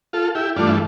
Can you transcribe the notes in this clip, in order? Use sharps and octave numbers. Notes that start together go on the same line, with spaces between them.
F4 A4
E4 G4
G2 E3 A3 D4 F4